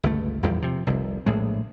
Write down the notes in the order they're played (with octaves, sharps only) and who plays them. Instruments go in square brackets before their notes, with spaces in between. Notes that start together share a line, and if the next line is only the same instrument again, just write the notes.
[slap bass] G1 C#2 A3
A#1 E2 G3
C3 F3
F1 C2
A#1 A2 G#3